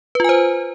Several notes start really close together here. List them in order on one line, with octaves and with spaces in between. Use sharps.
B4 F4 G#5 C5